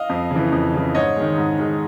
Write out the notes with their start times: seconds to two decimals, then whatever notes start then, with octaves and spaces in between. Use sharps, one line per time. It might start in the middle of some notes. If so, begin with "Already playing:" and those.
Already playing: D#5 F5
0.09 F2
0.31 C#3 E3
0.52 F2
0.74 C#3 E3
0.95 G#2 C#5 D#5
1.16 D#3 G#3
1.38 G#2
1.58 D#3 G#3